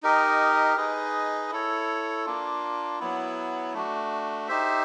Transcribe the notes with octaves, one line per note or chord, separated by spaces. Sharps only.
D#4 G4 A#4 D#5
D#4 G#4 B4 D#5
E4 A4 C#5
A#3 D4 F4
F#3 B3 E4
A3 D4 F#4
D#4 G4 C5 E5